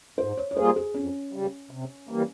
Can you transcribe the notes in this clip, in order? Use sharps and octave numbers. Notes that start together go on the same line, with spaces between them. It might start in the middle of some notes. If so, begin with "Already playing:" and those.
G#2 C5
C#5
C#5
G3 A#3 F4 G#4 C5
G#4
F2 C#4
C#3 G3
C3
E3 G3 A#3